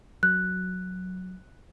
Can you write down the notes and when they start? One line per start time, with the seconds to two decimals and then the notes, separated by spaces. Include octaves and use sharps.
0.23 F#3 F#6